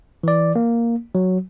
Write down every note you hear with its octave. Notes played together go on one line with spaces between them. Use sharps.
E3 D5
A#3
F#3